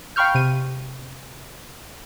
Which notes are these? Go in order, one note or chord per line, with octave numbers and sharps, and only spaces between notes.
F5 G5 B5 C#6 F6 G6
C3 D#7